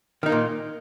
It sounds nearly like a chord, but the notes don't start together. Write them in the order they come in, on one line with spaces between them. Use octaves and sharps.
D#3 D#4 A#3 A#2